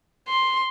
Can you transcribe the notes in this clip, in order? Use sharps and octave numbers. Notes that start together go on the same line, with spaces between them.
C6